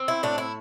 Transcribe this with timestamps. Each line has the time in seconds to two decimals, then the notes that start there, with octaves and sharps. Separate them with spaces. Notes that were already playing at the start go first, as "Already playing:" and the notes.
Already playing: C4
0.08 E4
0.23 A2 D4
0.38 E4